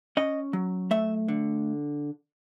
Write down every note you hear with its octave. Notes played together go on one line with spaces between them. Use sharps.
C#4 D#5
F#3
A3 E5
D3